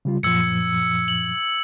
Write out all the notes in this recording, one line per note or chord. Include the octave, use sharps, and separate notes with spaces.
C#3 G3 F4
F#2 A#2 F3 E6 G#6 C#7
F#7